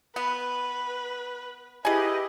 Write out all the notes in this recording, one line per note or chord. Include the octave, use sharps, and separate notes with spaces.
B3 B4
E4 G4 G#4 B4 D#5 G#5